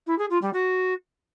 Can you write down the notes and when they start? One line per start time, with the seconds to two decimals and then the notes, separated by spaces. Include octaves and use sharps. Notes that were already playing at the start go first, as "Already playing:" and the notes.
0.07 E4
0.18 G#4
0.30 F4
0.42 G3
0.53 F#4